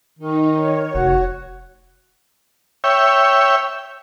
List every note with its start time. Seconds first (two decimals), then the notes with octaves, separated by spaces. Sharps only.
0.19 D#3 D#4
0.54 C#5
0.95 F1 F#4
2.84 C#5 E5 G5